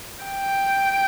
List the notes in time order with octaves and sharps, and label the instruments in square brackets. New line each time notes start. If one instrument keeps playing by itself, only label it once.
[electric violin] G5